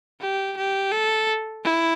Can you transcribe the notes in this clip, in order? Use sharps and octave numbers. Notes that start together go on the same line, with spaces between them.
G4
G4
A4
E4